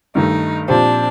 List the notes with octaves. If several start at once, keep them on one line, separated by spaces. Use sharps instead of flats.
G2 D#3 A3 D#4
A#2 F3 C4 D4 G4 C5